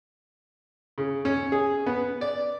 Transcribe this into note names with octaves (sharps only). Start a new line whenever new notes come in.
C#3
C#4
G#4
B3
D5